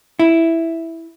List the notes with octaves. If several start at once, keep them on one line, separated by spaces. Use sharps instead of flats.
E4